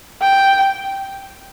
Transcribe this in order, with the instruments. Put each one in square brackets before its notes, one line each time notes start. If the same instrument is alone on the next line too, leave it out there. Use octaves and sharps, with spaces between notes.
[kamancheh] G5